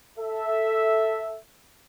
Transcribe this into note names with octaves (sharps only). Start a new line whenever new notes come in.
A4 E5